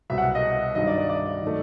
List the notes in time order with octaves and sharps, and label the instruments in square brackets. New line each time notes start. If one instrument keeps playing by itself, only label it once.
[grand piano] C2 B2 F#3 B3 [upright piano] E5
[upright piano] F#5
D#5
[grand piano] G2 D#3 F#3 [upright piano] D#5
[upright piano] D5
D5
D5
[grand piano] D#3 F#3 A3